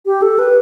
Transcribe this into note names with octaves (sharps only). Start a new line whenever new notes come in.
G4
A4
B4